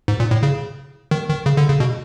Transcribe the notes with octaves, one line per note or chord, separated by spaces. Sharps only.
G#2
A#2
A2
C#3
D#3
D#3
C#3
D3
C#3
B2